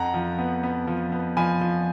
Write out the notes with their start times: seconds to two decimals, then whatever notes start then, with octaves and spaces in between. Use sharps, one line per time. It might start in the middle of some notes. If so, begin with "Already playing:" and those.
Already playing: F2 F#5 A#5
0.14 F3
0.39 B3
0.63 B3
0.87 F3
1.12 B3
1.37 F3 G#5 B5
1.61 F3